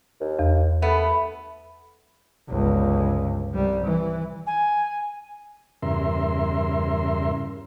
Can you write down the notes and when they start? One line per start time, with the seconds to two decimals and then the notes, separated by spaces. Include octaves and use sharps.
0.20 D#2
0.39 E2
0.82 A3 B3
2.49 G1 C#2
3.54 C2 G3
3.85 E3
4.47 G#5
5.82 E2 G2 C#3 A#4 E5 C6